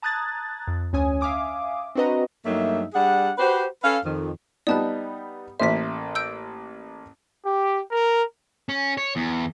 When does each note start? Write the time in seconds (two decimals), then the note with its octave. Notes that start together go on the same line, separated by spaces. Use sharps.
0.02 A5 A#5 D#6 F#6 G#6 A6
0.67 F2
0.93 D2 C#4 C#5 G#5 D#6
1.21 E5 F5 G#5 D6 D#6
1.95 C4 D4 F#4 B4 D#5 A#5
2.45 G2 F#3 A3 A#3 D#4 E5
2.94 G3 D4 G#4 F#5
3.38 F#4 G4 B4 C5
3.83 C#4 A4 B4 F5
4.04 F2 D#3
4.67 G3 B3 D#4 D5 A5 F#6
5.60 A1 A#3 C5 E5 B6
6.15 E6 G6 D7
7.45 G4
7.90 A#4
8.69 C#4
8.98 C#5
9.16 E2